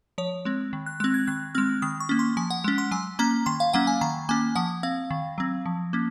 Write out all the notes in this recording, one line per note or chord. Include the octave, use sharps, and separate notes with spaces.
F3 C#5
G#3 C4
D#3
F#6
G#3 C4 F#6
G#6
D#3 F#6
G#3 C4 F6
D#3 D#6
C#6
A#3 C#4
C6
F3 G#5
F#5
G#3 C#4
C6
F#3 G#5
A#3 C#4 A#5
D#3 C6
F5
F#3 A#3 C#4 F#5
G#5
D#3 A#5
A#3 C#4 G#5
F3 F#5
C4 F5
D#3
F#3 C4
F3
A#3 C#4